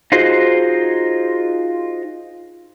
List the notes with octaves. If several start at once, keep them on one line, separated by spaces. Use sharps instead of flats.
D#4 F4 F#4 G#4 C5